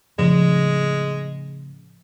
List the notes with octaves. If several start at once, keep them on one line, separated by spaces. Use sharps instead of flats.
A2 C#3 F3 G#3